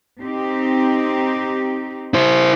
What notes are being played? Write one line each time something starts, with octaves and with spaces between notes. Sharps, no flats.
C4 D#4 G4
E4 C5